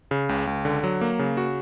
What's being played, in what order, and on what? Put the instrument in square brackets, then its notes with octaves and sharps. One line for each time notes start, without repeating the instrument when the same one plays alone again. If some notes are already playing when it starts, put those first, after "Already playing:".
[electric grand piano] C#3
C#2
C#2
D3
F#3
A#3
C#3
F#4